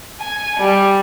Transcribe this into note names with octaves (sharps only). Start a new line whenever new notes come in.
G#5
G3